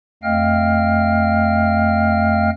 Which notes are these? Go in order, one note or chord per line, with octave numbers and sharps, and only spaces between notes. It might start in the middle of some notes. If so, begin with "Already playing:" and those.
F2 A3 D#5 F5 G5 F6